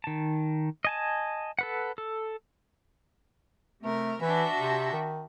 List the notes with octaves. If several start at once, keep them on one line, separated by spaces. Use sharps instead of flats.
D#3 A5
D#5 G#5 A5
A4 B4 F#5
A4
C3 A3 A#4
E3 D4 F#4 E5
C3
D#3